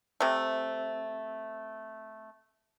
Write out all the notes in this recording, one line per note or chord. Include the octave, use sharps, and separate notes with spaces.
C3 A3